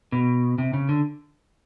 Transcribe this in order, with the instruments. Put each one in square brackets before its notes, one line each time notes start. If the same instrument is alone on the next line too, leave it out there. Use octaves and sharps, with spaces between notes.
[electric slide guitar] B2
C3
C#3
D3